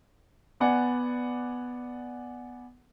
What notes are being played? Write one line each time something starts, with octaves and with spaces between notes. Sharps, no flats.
B3 D5 F#5 G#5